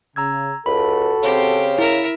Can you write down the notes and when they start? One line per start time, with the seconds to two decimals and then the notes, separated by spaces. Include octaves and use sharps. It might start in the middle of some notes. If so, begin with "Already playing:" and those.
0.16 C#3 A#5 E6 G#6
0.66 C#2 F#4 A4 B5
1.22 C#3 C4 G4
1.78 E4 A#4 E5